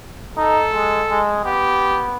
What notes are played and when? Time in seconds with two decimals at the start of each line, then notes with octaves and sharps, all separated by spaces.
0.37 D#4 A4
0.73 G#3
1.10 G#3
1.45 B3 G4